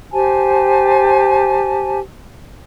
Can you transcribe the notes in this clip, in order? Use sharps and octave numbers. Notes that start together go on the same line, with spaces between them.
G4 C5 G#5 A5